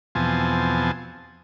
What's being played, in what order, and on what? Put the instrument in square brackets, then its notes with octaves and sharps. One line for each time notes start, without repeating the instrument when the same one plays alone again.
[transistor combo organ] E2 B2 F3 C4 G#5 A5